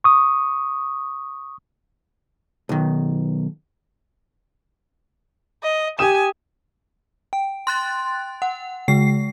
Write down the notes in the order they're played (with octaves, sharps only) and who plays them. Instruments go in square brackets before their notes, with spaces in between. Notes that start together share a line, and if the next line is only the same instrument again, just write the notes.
[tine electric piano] C#6 D#6
[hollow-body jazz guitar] B1 D#3
[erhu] D#5
[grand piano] G4 D#6 E7 [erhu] G#5
[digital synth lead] G5
[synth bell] C6 F#6 A6
F#5
[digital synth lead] C#3 [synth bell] G#3 C7